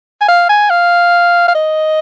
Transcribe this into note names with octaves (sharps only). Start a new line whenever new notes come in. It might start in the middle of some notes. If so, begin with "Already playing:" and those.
G#5
F5
G#5
F5
F5
D#5